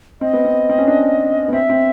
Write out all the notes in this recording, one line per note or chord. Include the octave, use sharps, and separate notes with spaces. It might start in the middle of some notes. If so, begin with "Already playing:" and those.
C4 D#5
B3
C4
C4
C#4
D4
B3
C4 E5
C4